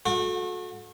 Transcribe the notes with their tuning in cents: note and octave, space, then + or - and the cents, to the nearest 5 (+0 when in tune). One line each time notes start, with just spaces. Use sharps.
A3 -20 F#4 -35